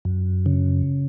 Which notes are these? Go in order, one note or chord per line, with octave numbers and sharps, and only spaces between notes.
F#2
C#3